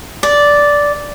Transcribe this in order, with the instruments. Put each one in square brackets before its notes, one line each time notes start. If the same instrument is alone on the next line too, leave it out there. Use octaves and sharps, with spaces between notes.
[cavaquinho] D5